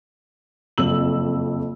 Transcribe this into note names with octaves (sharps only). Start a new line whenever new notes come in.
F#1 F2 E6 F#7